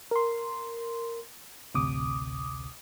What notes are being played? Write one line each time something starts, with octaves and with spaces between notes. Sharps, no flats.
A#4 C6
A1 D2 C3 D6 D#6